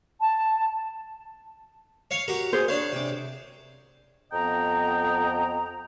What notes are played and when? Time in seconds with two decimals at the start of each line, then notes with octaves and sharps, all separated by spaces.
0.20 A5
2.11 C#5 F5 C#6
2.28 F#4 G4 A#4
2.53 G#4 C5
2.68 D4 C#5 F5
2.92 C3 D6
4.32 F2 B3 D#5 G5 A#5